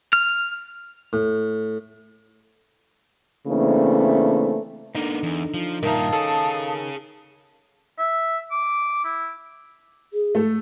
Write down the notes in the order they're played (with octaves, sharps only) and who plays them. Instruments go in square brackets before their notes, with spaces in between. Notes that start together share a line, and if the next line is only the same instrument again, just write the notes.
[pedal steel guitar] F6
[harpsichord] A2
[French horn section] C#3 E3 A3 A#3 C4 D4
[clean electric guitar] D3 D#4 [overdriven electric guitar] A#3 B3
[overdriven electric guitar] E2
F3
[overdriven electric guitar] G2 A#2 [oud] D#3 D#4 [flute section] F5 A5 D#6
[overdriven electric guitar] G#4 C#5 [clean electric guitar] A4
[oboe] E5
D6
E4
[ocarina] G#4
[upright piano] A3 A4